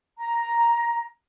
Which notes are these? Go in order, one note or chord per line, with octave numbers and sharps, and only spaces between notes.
A#5